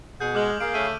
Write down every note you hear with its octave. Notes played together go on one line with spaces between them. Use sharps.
B2 G#4 F#5 G6
G#3 D6 F6 F#7
A#3 G#4 F5 D7
C#3 A3 D#7